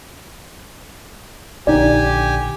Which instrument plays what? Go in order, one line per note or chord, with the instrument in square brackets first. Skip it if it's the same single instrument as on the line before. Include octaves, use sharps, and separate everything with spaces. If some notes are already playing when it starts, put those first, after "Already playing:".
[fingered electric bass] A#1 D3 [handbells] D#4 D5 [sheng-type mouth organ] G4 G#5